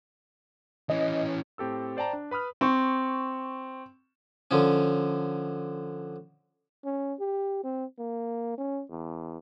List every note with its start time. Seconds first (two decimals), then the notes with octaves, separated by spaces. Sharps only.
0.90 E3 C#4 D#5
1.58 A2 C4 G4 A4 E6
1.97 C5 D5 G5 A5 A#5
2.13 D4
2.31 B4 B5 D#6 F6
2.61 C4 C#6
4.51 D3 F3 C#4
6.85 C#4
7.20 G4
7.64 C4
7.98 A#3
8.58 C#4
8.91 E2